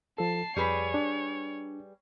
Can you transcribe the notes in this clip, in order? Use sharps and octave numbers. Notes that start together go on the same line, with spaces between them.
F3 A4 A5 C7
F2 G3 G#4 B4 C#5 B5
D4